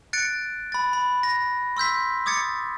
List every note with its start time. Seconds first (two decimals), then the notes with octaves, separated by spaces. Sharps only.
0.13 F#6 A6 C#7 D7
0.72 B5 A6
0.93 B5
1.23 A#6
1.77 C6 E6 G6 B6
2.26 D6 D#6 G#6 A6 C#7